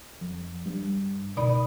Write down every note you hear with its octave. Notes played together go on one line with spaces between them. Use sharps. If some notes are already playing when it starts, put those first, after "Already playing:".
F2
G2
C#2 B2 D#3 D5 B5 D#6